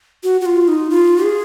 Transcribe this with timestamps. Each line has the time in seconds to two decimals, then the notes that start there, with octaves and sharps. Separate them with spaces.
0.24 F#4
0.41 F#4
0.46 F4
0.68 D#4
0.90 F4
1.24 G#4